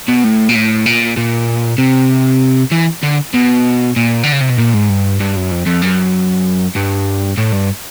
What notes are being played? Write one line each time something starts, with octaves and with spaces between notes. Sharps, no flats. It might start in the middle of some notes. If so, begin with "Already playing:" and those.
B2
A2
A#2
A2
A#2
A#2
C3
E3
D3
B2
A#2
D3
C#3
C3
B2
A#2
G#2
G2
G2
F#2
F2
F2
F#2
G2
A2
G2